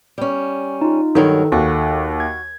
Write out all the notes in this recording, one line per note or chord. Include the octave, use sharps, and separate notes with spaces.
G3 C#4
D#4 F4
G2 D#3 F#3 A4 A#4
D#2 F#4
G#6